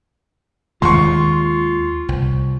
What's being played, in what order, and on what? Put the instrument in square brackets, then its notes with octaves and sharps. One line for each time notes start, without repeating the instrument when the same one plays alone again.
[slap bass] D#2 D#3 G#3 [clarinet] F4 [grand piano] C6 C#6
[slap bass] C2